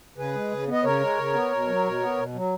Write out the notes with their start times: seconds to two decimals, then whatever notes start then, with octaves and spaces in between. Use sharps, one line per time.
0.17 C#3 G#4 B4
0.34 G#3
0.51 C#3
0.67 B3
0.73 D#5
0.84 C#3 A#4 C#5
1.00 G#3
1.17 C#3
1.33 B3
1.51 B2
1.67 F#3
1.84 B2
2.00 B3
2.17 B2
2.34 F#3